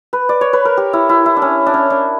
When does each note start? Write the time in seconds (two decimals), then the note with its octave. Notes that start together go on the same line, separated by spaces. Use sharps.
0.13 B4
0.29 D5
0.41 C#5
0.53 B4
0.65 A#4
0.77 G4
0.93 E4
1.09 E4
1.26 E4
1.37 D4
1.42 C#4
1.66 D4
1.74 C#4
1.90 D4